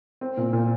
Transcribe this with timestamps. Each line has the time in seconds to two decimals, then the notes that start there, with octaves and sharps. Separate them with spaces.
0.21 C4
0.37 A#2
0.53 A#2